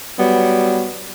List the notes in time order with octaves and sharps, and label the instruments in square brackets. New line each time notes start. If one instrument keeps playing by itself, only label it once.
[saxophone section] F#3 G3 B3